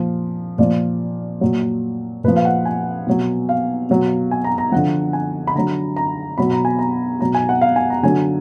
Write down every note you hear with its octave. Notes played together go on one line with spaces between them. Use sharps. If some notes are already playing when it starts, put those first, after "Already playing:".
Already playing: A#2 F3
A#2 F3 D5
A#2 F#3
A#2 F3 B4
F5
F#5
G#5
B2 F#3
F5
B2 F#3
G#5
A#5
A#5
D3 F3 F#5
G#5
B5
D3 F#3 A#5
A#5
B2 F#3 B5
A#5
G#5
A#5
B2 F#3 A#5
G#5
F#5
F5
G#5
A#5
D3 F#3 G#5